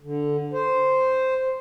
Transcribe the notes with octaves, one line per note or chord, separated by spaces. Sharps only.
D3
C5